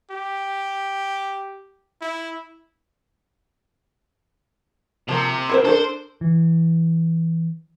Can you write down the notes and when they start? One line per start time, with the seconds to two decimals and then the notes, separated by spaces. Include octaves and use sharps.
0.11 G4
2.01 E4
5.09 C3 F3 A#3
5.49 E4 A#4 C5
5.65 D4 A4 A#4 C5
6.21 E3